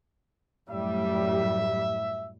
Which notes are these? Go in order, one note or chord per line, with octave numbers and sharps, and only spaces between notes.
F#2 A2 G3 E5